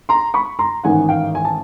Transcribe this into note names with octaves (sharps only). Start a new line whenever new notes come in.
A#5 C6
B5 C#6
A#5 C6
A1 G#2 D#3 F#5 G#5
F5 G5
G#5
A5